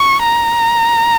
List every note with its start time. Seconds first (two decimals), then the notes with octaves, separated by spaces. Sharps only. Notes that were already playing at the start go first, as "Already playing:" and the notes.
Already playing: C#6
0.24 A#5